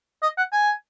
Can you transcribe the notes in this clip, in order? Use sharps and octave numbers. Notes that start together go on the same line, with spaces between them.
D#5
F#5
G#5